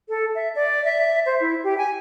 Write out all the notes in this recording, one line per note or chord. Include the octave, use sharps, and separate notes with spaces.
A4
E5
D5
E5
C5
E4
G4
G#5